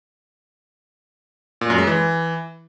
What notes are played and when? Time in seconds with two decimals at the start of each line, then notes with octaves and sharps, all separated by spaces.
1.61 A#2
1.70 F#2
1.78 G#3
1.87 E3